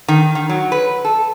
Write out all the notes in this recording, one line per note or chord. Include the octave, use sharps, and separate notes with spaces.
D#3
D#3
F#3
B4
A4